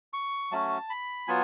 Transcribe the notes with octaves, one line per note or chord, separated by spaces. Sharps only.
C#6
F#3 A3 C#4 F#4 A5
B5
F#3 B3 F4 G#5